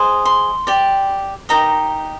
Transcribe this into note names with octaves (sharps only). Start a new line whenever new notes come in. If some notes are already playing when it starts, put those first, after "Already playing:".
Already playing: G#4 C5 D#5
C6
G4 D5
D#4 G4 A#4 D#5 A#5